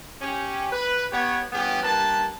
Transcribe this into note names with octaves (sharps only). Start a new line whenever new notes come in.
C#4 G4
B4
B3 G4 C#5
G2 E3 B3 C#4 F4 G4
G2 A#3 B4 A5